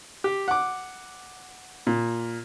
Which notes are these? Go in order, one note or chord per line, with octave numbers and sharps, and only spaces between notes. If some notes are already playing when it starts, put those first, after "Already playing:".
G4
F#5 D6
A#2